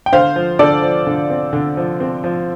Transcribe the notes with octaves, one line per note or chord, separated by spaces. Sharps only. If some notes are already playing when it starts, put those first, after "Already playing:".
G5
D3 C5 F5
F3
D3 A4 D5
F3
D3
C4
D3
F3
C4
F3